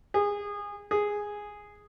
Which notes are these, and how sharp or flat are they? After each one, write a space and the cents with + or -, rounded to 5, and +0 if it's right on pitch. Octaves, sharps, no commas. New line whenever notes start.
G#4 -25
G#4 -5